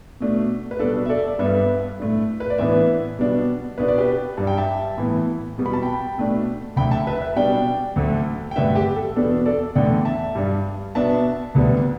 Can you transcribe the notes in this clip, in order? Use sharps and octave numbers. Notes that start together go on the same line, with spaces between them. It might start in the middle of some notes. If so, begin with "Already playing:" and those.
B2 A3 D4
B4
B2 G3 D4 A4 D5
E5
A4 D5
D5
G2 G3 B3 D4 B4 E5
A2 A3 D4
B4
D5
A2 E3 B3 D4 B4 E5
B2 G3 B3 D4
B2 B3 D4 B4
D5
G4 B4
G2 G3 D4 A5
G5
E5 A5
A2 E3 B3
B2 G3 B3
B5
A5
G5 B5
B2 A3 D4
D2 D3 A3 G5 B5
E5 A5
B4 E5
B4 E5
B2 G3 D4 D5 G5
D2 D3 A3
G5
G2 D3 A3 D4 B4 E5
G4
A4
E2 B2 B3 D4 A4
A4 D5
E2 D3 A3 D4 D5 G5
E5 A5
G2 G3 D4
B2 B3 D4 E5 A5
D2 D3 G3 B3 D4